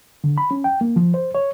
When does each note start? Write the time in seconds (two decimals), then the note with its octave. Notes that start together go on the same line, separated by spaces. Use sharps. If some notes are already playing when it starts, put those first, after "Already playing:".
0.24 D3
0.38 B5
0.51 C#4
0.64 G5
0.81 A#3
0.96 F3
1.14 C5
1.35 C#5